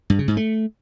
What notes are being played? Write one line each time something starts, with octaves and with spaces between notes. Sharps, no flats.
G2
C#3
G#2
A3